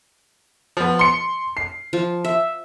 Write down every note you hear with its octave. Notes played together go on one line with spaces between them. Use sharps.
F3 B3
C6 C#7
C7
F3
E5